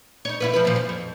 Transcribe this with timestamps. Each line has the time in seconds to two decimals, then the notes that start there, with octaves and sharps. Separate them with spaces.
0.25 D#4 C#5
0.40 E4 F4 B4
0.54 F3 E4 B4
0.65 A#2 F3
0.76 F#2
0.89 F2